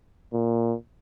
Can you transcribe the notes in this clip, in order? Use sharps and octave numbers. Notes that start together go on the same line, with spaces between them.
A#2